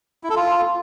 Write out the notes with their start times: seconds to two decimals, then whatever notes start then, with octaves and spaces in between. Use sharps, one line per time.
0.24 E4
0.30 A4
0.36 F4